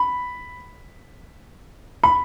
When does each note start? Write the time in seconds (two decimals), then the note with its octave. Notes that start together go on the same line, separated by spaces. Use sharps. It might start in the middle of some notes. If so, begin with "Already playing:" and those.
Already playing: B5
2.04 B5